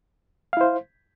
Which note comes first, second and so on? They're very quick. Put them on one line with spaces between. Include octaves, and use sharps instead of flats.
F5 E4 C5